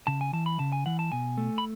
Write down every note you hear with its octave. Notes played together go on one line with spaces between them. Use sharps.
C#3 A5
G#5
E3 A5
B5
C#3 A5
G#5
E3 F#5
A5
B2 G#5
A3
B5